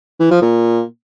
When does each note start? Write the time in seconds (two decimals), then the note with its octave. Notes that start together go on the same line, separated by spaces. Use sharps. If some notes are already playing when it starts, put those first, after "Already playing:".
0.20 E3
0.31 F3
0.42 A#2